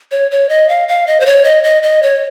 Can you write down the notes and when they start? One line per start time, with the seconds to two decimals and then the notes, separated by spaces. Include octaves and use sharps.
0.11 C#5
0.31 C#5
0.49 D#5
0.69 F5
0.88 F5
1.07 D#5
1.20 C5
1.26 C#5
1.44 D#5
1.64 D#5
1.83 D#5
2.03 C#5